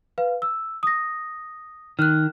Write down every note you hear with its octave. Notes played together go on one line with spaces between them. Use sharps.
B4 F5
E6
D#6 A#6
D#3 F6 F#6